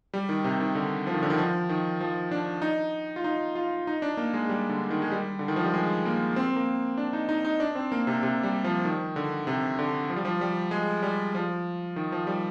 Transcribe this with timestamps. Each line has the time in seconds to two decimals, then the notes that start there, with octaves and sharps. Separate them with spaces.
0.14 G3
0.29 D#3
0.44 C3
0.60 D#3
0.75 D3
1.07 F3
1.14 D#3
1.23 D3
1.30 D#3
1.38 F3
1.69 D#3
2.01 F3
2.32 D4
2.62 D#4
3.16 F4
3.24 D#4
3.55 F4
3.87 D#4
4.02 D4
4.17 A#3
4.34 G#3
4.49 G3
4.69 D3
4.90 D#3
5.02 G#3
5.12 G3
5.39 D3
5.48 D#3
5.56 F3
5.64 G3
5.74 G#3
6.05 A#3
6.36 C4
6.56 A#3
6.98 D4
7.13 D#4
7.29 D#4
7.45 D#4
7.60 D4
7.75 C4
7.92 A#3
8.07 C3
8.23 C3
8.43 G3
8.64 F3
8.85 D#3
9.16 D3
9.47 C3
9.79 D3
10.10 F3
10.16 G3
10.25 F3
10.41 G3
10.71 G#3
11.03 G3
11.35 F3
11.96 D#3
12.12 F3
12.27 G3